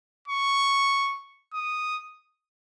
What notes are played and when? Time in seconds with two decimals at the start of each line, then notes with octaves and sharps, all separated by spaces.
0.28 C#6
1.54 D#6